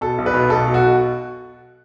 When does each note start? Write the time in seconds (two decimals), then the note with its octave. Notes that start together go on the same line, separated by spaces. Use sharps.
0.01 B2 A4
0.18 B1
0.26 B4
0.34 B2
0.50 B1 A4
0.65 B2
0.74 F#4
0.82 B2